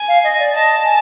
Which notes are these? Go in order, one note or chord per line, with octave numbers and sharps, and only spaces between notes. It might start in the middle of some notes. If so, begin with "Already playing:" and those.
Already playing: G#5
F5
D#5
D5
D#5 A5
G#5